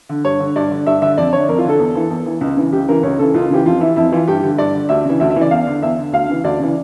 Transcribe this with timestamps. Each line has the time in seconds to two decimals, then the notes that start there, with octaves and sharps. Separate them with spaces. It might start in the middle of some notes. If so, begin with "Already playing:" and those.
0.09 D3
0.25 G2 C#5
0.40 D3
0.56 G2 D5
0.71 D3
0.86 G2 E5
1.02 D3 E5
1.18 F2 D5
1.33 D3 C#5
1.49 F2 A#4
1.58 F4
1.64 D3 A4
1.79 E2
1.95 E3
2.10 E2
2.26 E3
2.41 C#2
2.57 C#3 E3
2.73 C#2 G4
2.88 C#3 E3 A#4
3.03 C#2 C#5
3.18 C#3 E3 A4
3.34 C#2 F4
3.50 C#3 E3 G4
3.66 F2 F4
3.80 E3 E4
3.96 F2 E4
4.12 E3 F4
4.28 G2 G4
4.43 D3
4.58 G2 D5
4.74 D3
4.89 D2 E5
5.05 C#3 E3
5.20 D2 E5
5.30 E5
5.36 C#3 E3
5.41 D5
5.51 E2 F5
5.67 D3
5.83 E2 E5
5.98 D3
6.13 D2 F5
6.28 C#3 E3
6.44 D2 D5
6.60 C#3 E3